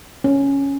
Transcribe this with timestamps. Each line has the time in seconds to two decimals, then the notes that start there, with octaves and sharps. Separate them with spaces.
0.24 C#4